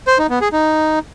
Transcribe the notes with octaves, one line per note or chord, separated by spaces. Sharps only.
C5
D#4
B3
G#4
D#4